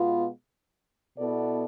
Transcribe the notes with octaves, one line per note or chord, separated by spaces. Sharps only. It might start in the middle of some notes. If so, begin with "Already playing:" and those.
Already playing: B2 G#3 B3 F4
B2 B3 E4 A4 D5